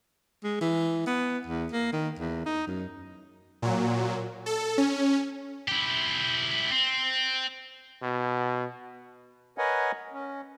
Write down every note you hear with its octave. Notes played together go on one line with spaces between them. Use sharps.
G#3
E3
B3
E2
A#3
D#3
E2
D#4
F#2
A#2 F#3
A4
C#4
E4 G4
C4
B2
A#4 B4 C#5 D#5 F#5 G#5
C#4